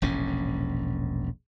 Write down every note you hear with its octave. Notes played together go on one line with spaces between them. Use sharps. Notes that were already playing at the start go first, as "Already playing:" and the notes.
E1 A#1 A2 C#4